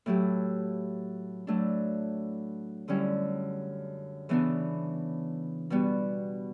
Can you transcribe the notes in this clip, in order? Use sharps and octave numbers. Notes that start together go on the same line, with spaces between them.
A2 F#3 A3 E4 G4
A2 F#3 A3 D4
F#2 D3 G3 C#4 E4
C#3 E3 B3 D4
B2 G3 B3 F#4